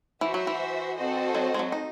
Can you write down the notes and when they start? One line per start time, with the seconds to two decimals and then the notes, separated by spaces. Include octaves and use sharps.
0.21 E3 F#4 C5 E5
0.34 F#3
0.47 E3
0.97 C4 F#4 A4 C5 D#5
1.35 F#3
1.54 G#3
1.59 F#3
1.72 D#4